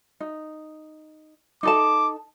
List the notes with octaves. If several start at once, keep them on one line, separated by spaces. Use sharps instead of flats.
D#4
D#4 A4 A5 D6